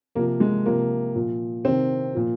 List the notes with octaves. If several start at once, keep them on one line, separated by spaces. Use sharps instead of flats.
C3 F3 A#3
G#3
C3 F3 A#3
A#2 F3
C3 D#3 C4
A#2 F3